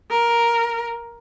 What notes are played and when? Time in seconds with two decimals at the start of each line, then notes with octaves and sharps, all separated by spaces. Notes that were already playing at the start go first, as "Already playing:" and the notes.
0.10 A#4